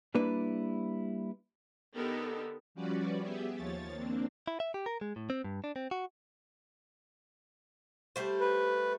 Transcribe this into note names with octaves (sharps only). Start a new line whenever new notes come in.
G3 A#3 D4 E4 B4
D3 B3 D#4 G4 A4 A#4
F3 G3 C#4 F#4 B4 D5
B3 G4 G#4 E5
D#2 F3 C#5 A6
A#3 C4 D4
E4
E5
G4
A#4
G#3
A2
C4
G2
D4
C4
F#4
G3 A3 C5
B4